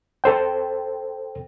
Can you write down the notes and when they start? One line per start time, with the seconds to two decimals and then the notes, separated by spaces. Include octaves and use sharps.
0.24 A4 C5 G5